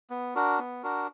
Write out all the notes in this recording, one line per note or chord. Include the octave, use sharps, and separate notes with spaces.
B3
D4 F#4 A#4
B3
D4 F#4 A#4